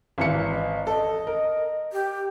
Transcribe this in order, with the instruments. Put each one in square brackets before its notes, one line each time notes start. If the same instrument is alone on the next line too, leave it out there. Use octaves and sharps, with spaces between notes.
[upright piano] G#1 E3 C#7
[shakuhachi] D#5
[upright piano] A4 [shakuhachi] D#5
[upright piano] A#4
[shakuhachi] G4